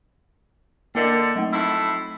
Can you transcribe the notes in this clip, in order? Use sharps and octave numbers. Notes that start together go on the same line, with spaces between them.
D3 A#3 A#4 D#5
F#3 A3
F2 A2 E4